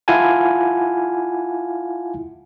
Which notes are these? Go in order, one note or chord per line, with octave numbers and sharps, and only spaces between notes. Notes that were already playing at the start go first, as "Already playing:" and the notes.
E4 F4 F5 F#5 G#5 A5